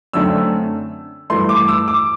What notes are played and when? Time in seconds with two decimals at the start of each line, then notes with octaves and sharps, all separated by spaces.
0.13 F#2 D3 A3 C4 E6
1.30 G2 E3 A3 C6
1.49 D6
1.68 E6
1.88 D6